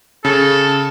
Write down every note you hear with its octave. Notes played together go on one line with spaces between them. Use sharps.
C#3 A4